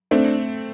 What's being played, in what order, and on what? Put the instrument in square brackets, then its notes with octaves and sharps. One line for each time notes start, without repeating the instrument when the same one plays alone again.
[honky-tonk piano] A3 C4 [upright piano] D4